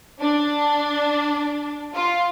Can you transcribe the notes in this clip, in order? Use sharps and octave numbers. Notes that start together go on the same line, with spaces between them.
D4
F4